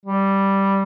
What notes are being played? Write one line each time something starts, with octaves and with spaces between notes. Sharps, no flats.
G3